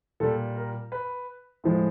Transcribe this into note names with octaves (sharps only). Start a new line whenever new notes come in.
A#2 G3 A4
A#4
B4
A2 F3 G#3